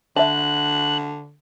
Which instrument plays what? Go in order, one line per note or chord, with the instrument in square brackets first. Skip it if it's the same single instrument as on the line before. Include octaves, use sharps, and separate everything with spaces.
[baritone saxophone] D3 [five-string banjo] E5 A5 [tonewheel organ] F#6